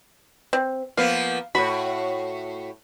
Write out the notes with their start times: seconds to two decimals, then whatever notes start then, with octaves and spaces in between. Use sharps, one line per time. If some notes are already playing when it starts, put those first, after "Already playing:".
0.53 C4
0.97 F3 A#3 B3 F5
1.55 A2 F#4 B5